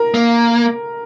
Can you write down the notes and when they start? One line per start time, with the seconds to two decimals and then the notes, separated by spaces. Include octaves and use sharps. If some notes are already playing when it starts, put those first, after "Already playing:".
Already playing: A#4
0.14 A#3